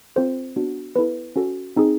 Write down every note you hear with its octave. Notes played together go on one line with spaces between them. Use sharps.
C4 F4 A4 C5
B3 D4 F#4
B3 E4 A4 B4
C#4 F#4 A4
C4 D#4 G#4